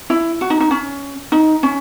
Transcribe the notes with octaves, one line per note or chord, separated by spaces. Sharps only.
E4
F#4
D#4
D#4
C#4
D#4
C#4